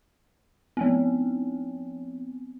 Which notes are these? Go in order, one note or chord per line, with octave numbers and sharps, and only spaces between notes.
F3 B3 C4